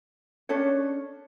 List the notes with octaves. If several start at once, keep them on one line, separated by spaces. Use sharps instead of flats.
C#4 D4 A4 C#5